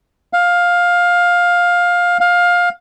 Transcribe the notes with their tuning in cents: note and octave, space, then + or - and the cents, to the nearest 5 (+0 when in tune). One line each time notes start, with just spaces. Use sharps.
F5 +15
F5 +20